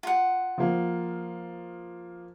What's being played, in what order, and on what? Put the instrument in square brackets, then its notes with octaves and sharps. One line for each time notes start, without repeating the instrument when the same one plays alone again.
[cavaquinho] F4 F#5
[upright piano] F3 A#3